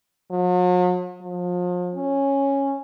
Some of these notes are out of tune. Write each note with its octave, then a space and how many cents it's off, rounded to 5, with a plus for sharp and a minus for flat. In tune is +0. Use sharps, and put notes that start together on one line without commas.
F#3 -45
F3 +35
C#4 -5